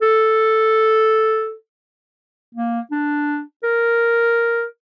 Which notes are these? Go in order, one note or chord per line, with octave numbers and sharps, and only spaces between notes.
A4
A#3
D4
A#4